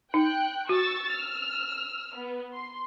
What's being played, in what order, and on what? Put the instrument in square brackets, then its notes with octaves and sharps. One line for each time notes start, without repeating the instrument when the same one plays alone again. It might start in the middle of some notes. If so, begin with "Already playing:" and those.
[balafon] D#4 [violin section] G5 F#6
[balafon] F#4 [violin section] C#6 E6 A6
[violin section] E6 F6
B3
C6